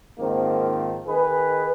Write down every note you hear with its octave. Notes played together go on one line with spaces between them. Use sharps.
G#2 D#3 F3 A#3 C4
D#3 G#4 B4